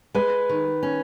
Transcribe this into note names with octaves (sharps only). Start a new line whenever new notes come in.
G#3 B4
D#3
C#4